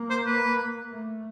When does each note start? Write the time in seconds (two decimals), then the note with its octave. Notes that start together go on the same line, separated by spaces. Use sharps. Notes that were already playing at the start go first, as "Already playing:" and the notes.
Already playing: A#3
0.10 C5
0.26 B4
0.90 A3